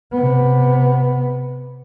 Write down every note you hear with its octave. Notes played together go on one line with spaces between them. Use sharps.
C3 B3